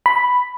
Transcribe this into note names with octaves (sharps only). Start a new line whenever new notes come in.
B5